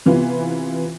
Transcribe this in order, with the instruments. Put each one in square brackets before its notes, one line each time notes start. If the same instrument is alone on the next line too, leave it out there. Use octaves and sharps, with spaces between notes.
[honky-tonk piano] C3 E3 B3 F4